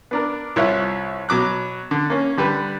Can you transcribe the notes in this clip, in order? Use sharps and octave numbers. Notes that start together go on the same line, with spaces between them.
B3 D4 A#4
C2 E4 F4 C#5 F#6
B2 F#3 D6 F#6
D3
A#3 C#4
D3 G3 B4